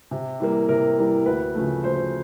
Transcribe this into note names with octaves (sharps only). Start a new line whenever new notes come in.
C3
E3 G3 A#3
C3 A#4
E3 G3 A#3
D2 B4
C#3 F3 A3
D2 C5